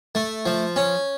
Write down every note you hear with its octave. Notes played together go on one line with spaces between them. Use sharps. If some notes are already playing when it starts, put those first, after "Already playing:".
A3
F3
C#4